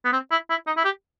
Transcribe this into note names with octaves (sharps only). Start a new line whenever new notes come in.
B3
C4
E4
E4
D#4
E4
G4